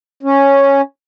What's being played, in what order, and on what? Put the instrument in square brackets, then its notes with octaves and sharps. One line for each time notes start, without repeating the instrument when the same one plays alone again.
[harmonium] C#4